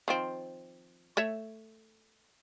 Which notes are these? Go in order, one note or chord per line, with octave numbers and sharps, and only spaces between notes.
D#3 F3 C4
A3 C#5 E5